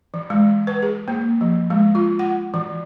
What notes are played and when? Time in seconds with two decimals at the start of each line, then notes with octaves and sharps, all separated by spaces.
0.14 E3
0.30 G#3
0.67 B4
0.82 G#4
1.08 A#3
1.41 F3
1.70 G#3
1.95 F4
2.19 F#5
2.54 E3